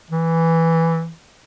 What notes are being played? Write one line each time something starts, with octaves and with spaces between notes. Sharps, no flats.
E3